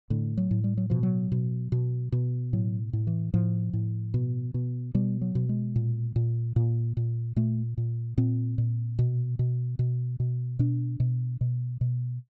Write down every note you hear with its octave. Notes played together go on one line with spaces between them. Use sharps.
A2 D3
F#3
A2
G3
F#3
B2 F3
F#3
B2
B2
B2
A2 F#3
A2
E3
A2 F3
A2
B2
B2
B2 G3
F#3
B2
G#3
A#2
A#2
A#2
A#2
A#2 A3
A#2
A#2 C4
A#2
B2
B2
B2
B2
B2 D4
B2
B2
B2